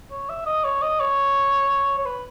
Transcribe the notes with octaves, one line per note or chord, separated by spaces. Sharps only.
C#5
E5
D#5
C#5
D#5
C#5
C#5
B4